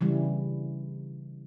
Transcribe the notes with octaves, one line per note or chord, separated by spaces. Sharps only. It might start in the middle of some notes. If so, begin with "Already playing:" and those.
C#3 E3 G3